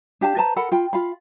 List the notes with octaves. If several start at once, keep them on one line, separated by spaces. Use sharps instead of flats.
D4 G4 F5 A5
B4 C5 A5 A#5
A4 A#4 F#5 B5
F4 G5 B5
F4 F5 B5